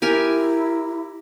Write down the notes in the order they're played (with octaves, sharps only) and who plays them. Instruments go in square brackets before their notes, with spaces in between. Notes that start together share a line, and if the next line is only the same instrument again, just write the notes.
[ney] E4 [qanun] G4 A#4 G#5